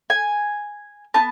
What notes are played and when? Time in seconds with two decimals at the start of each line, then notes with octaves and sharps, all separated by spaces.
0.10 G#5
1.14 B3 D#4 A5